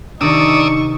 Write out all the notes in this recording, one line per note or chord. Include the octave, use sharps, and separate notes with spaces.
C3 D#3 D4 D#4 D5 C#6 D#6 E6